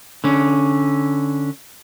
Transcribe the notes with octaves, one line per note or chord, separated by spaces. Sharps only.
D3 C#4